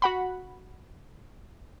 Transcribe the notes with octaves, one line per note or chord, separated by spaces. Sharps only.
F#4 F#5 B5